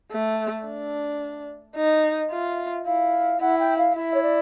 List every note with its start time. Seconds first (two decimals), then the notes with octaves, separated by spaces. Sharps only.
0.11 A3
0.66 D4
1.76 D#4
2.31 F4 E5
2.85 E4 F5
3.41 E4 F#5
3.59 G5
3.78 F5
3.96 E4 E5
4.14 C#5
4.23 D5